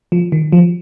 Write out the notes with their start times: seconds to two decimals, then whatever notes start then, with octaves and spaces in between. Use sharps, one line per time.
0.12 F3
0.32 D#3
0.52 F3